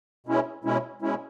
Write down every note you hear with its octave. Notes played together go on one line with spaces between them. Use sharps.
B2 G#3 C#4 E4
B2 G#3 C#4 E4
B2 G#3 C#4 E4